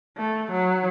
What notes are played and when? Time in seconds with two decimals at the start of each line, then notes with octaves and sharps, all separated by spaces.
0.17 A3
0.52 F#3